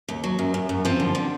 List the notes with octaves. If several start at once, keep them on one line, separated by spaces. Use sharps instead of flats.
D#2
F#3
F#2
F#2
F#2
F3 C4
D3
D3